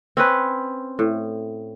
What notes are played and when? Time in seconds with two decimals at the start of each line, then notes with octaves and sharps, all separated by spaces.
0.17 C4 C#4 B4
0.99 A2